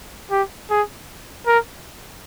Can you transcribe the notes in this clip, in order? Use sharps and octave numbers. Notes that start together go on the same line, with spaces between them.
G4
G#4
A#4